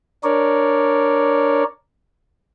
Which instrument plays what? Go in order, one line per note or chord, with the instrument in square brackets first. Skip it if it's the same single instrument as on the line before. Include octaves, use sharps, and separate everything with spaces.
[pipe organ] D4 A#4 C#5 D5